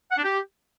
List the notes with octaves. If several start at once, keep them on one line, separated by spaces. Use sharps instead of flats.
F#5
D4
G4